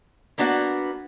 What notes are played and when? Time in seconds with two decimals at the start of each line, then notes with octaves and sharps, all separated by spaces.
0.38 A#3 B3 D4 F#4 D5 F#5